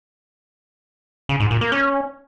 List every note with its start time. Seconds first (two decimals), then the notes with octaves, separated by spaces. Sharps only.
1.29 C#3
1.40 G#2
1.50 A#2
1.61 A#3
1.72 C#4